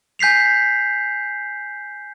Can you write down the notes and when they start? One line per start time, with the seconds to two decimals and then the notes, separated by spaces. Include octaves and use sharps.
0.19 G#5 G6 B6 C7 F7